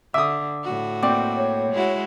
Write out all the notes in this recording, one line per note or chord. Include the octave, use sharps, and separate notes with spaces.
D3 E5 D6 D#6
A2 F#4
A#3 C4 D5 G5 D6
C#5
G#3 E4 F#4